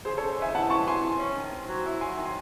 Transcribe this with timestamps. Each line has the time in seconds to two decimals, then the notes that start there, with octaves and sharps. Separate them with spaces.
0.05 C#3 G#4 C5
0.17 C#3 A4 C#5
0.38 D#4 E5 G#5
0.55 E3 F#5 A5
0.70 F#2 A5 C#6
0.86 E3 G#5 C6
1.03 D#3
1.20 C#4
1.36 D#3
1.51 C4
1.68 F#3
1.85 E4
2.01 F#3 G#5 C6
2.17 D#3
2.25 G#5 C6